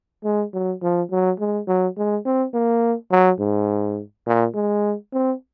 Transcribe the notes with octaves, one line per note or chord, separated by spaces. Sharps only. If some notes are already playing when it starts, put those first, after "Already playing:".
G#3
F#3
F3
F#3
G#3
F#3
G#3
C4
A#3
F#3
G#2
A#2
G#3
C4